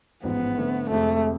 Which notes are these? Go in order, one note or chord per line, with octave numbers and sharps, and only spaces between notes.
A1 G#2 F3 B3
D3 A3 C4
F1 F2 C3 G#3 A3